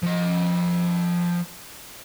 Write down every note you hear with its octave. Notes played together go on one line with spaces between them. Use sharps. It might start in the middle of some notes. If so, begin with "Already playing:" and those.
F3 D#5